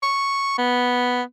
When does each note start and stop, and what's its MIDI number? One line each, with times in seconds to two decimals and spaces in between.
0.03 0.55 85
0.58 1.22 59